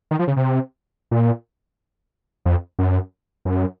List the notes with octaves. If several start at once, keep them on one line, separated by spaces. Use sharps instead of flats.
D#3
F3
C#3
C3
A#2
F2
F#2
F#2